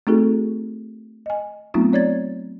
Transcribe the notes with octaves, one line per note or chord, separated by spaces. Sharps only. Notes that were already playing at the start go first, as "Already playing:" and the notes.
A3 C4 D#4 F#4 G#4 A4
D#5 G#5
F#3 A3 B3 C4 D#4 F4
C4 C#5 D5 G#6 A6